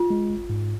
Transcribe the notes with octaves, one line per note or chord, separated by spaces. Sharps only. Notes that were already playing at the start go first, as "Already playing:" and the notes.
Already playing: F4
G#3
G#1
G#2